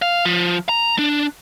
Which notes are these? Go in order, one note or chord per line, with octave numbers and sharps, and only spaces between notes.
F5
F3
A#5
D4